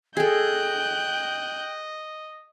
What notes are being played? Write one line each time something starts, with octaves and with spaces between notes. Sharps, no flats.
G#4 A4 D#5 G5 F#6 G6